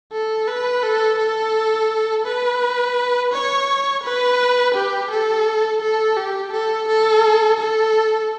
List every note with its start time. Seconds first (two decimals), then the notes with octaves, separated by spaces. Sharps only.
0.12 A4
0.48 B4
0.83 A4
1.19 A4
2.25 B4
3.32 C#5
4.03 B4
4.74 G4
5.10 A4
5.81 A4
6.17 G4
6.53 A4
6.88 A4
7.59 A4